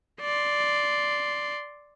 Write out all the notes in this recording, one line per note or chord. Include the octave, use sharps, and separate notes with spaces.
D5 C6